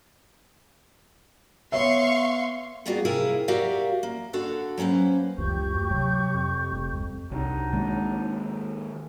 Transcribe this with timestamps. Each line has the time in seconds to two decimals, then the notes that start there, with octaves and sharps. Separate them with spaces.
1.72 B3 C#5 E5 F5 C6 C#6
2.86 G3 A#3 B3 F4 F#4 G#4
3.05 C3 E4 G#4 A#4 F5
3.48 F#4 G4 A#4 D5 E5 F5
4.03 A#3
4.33 D3 F#4 A4 F5
4.78 F#3 A#3 C#4 B4 C5
5.38 C#2 F#2 E3 G4 C#6 G6
5.74 D2
5.90 C3 F#3
6.34 F2
6.72 F1
6.93 G3 G#3
7.31 C2 F#3 D4 D#4
7.73 D#3 G#3 A#3